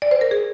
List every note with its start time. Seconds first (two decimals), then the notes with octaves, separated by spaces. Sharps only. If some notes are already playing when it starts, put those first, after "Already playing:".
0.02 D5
0.11 C5
0.21 A#4
0.31 G#4